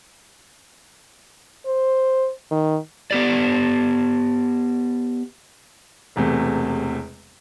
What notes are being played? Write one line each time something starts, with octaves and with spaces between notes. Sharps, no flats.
C5
D#3
B3 G4 D5
E1 E2 C3 A3